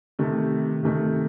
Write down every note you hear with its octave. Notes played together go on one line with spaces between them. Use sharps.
C3 D#3 A3
C3 D#3 A3